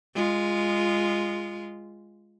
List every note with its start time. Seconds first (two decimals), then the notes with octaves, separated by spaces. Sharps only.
0.15 G#3 F4